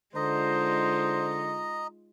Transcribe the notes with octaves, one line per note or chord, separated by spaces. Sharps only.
D3 G#3 D#4 F4 C5 D#5 A#5